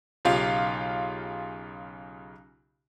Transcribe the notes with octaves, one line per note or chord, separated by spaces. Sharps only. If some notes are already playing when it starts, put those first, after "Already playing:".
B1 C#3 F4 G4 F5